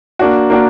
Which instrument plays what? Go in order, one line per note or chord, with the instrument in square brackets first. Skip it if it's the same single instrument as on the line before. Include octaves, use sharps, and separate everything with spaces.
[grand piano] A#3 D4 F#4
A#3 D4 F#4